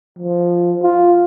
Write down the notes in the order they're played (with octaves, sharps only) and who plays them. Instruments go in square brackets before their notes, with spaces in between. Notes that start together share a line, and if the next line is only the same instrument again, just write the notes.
[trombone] F3
F4